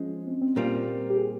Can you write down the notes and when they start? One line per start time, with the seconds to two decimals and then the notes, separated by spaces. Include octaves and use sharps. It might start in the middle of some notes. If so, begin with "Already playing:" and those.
Already playing: F3 G#3 C#4
0.27 C4
0.41 C4
0.56 A#2 G3 C4 F4 A#4
1.10 G4
1.16 G#4